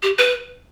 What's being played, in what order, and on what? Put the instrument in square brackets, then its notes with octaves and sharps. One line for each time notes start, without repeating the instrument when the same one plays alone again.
[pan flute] G4
B4